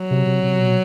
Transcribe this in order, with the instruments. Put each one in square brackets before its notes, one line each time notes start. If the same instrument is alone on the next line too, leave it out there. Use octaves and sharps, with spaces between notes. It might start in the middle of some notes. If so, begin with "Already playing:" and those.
Already playing: [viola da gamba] F#3
[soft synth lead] C3
C3
C3
B2